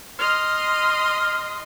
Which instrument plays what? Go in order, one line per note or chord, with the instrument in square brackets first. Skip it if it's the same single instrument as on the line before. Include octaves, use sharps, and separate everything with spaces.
[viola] D#5 C6 [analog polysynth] F6